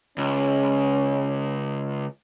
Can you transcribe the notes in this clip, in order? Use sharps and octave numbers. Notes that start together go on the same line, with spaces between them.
C#2 C#4